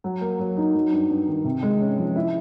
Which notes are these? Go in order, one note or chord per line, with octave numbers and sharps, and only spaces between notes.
F#3
A#3
F#3
D#4
F#3
G2
G2
D#3
C3
G#3
C#4
F3
E4